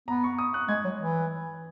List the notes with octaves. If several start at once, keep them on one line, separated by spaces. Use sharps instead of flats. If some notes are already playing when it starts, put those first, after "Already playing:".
B3 A#5
C#6
D#6
F#6
G#3 G#6
F#3
E3